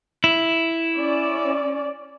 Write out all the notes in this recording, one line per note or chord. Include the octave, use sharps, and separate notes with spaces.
E4
C#4 D5